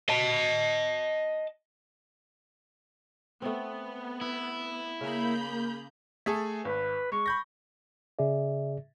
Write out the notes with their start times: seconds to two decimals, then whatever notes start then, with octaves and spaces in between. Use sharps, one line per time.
0.09 D#5 A5
3.42 A3 B3 C4
4.21 E4
5.01 C#3 A#3 G#4 A#5 B5 G6
6.26 A3 G#4 A4
6.65 G#1 B4
7.12 G#3 C#6
7.26 B5 G6 A#6
8.19 C#3 G#4 D5 E5